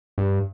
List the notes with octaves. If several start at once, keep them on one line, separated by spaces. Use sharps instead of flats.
G2